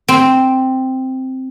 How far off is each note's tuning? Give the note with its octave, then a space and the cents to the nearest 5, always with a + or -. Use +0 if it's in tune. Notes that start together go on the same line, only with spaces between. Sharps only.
C4 +0